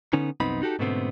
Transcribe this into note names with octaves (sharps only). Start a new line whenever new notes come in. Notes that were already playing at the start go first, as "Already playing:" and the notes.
D3 B3 C#4 D#4
C2 F#2 B3 C4 D#4 B5
D#4 F#4 G4 A4
G#2 B2 D3 A3 B3 C4